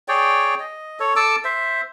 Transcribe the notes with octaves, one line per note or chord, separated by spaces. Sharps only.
G#4 C#5 D5 G5
D#5
A4 C#5
A4 A5 D6 E6
C5 E5